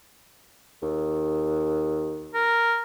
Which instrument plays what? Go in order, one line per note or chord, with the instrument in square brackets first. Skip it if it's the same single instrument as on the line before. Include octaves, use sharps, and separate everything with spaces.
[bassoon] D#2
[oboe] A#4